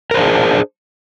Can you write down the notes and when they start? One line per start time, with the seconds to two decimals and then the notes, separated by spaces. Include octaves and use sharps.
0.11 A#4
0.14 C5
0.17 D4
0.20 G#4